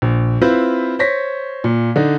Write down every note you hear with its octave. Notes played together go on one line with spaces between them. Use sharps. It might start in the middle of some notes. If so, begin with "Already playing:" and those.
A#1
C4 E4 F4 B4 C5
C5 C#5 A#6 B6
A#2
D3 D4 D#4